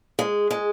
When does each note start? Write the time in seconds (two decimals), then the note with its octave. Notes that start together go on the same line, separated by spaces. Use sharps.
0.19 G#3
0.51 G#3